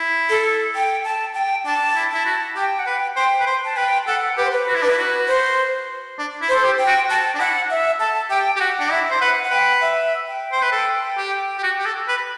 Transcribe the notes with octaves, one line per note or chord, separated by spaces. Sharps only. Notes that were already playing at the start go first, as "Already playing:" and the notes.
Already playing: E4
A4
G5
A5
G5
D4 A5
E4
E4 A5
F#4
G4 G5
F#5
B4 G5
C5 G5
B4
C5
A5
B4 G5
A4 F#5
G4 B4
C5
B4
F#4
E4
D4 B4
E4
F#4
C5
D4
E4
C5
A4
G4
G5
F#4
F#4 A5
D4
E4 F#5
E5
A4 A5
G4 G5
G4
F#4 F#5
D4
E4 E5
C5
B4 F#5
F#5
B4 G5
E5
G5
C5
B4
A4
G4
G4
F#4
G4
A4
B4